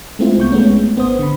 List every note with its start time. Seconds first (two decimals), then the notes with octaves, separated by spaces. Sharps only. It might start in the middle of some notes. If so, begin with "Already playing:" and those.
0.19 G#3 A3 C4 E4 F4
0.37 C2 B3 C#6 G6
0.52 G#3 A3 B3 C#4
0.96 G#1 B3 C5 D#6
1.19 D3 B5